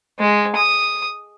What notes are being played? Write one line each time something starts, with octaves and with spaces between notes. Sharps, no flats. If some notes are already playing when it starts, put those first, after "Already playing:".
G#3
D#6